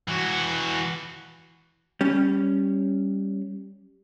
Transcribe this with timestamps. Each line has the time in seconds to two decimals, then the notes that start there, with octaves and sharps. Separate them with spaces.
0.08 E3 F#4
2.01 G3 C#4